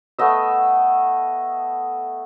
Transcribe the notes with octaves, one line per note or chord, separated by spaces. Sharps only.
A3 B3 D#5 E5